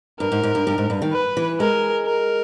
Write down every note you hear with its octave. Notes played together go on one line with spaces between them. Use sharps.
G2 A#4
G#2
G#2
G2
G2
G#2
G2
D#3
B4
E3
G#3 A#4
A#4